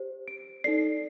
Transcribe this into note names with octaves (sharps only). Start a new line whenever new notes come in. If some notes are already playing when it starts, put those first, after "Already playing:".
Already playing: G4 C5
D7
D#4 A4 D5 C7